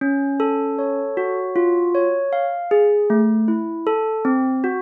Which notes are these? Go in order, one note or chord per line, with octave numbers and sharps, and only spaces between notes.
C#4
A4
C#5
F#4
F4
C#5
F5
G#4
A3
E4
A4
C4
F#4